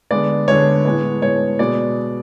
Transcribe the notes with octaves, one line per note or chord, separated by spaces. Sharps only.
D3 G#3 B3 D5
D3 G#3 B3 C#5
A2 G#3 B3
A2 G#3 B3 C#5
B2 G#3 B3 D5